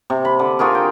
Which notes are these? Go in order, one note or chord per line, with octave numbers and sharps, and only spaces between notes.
C3
B5
D3
F4 F#4 G#4 A#4
G5